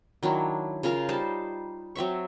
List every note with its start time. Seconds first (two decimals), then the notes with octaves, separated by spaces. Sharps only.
0.23 D#3 F#3 D4 E4
0.83 C#3 F4 A#4 A#5
1.09 G3 D#4 C5 A5
1.95 F#3 C4 E5 C#6